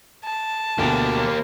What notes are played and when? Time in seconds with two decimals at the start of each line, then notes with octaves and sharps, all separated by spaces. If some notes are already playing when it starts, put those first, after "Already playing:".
0.24 A5
0.79 D2 B2 A#3 G4